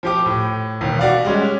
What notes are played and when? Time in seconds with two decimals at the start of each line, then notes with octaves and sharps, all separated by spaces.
0.03 F3 G4 D6
0.26 A2
0.81 E1 D#2
0.99 F#4 D5 F5
1.24 G3 G#3 C#4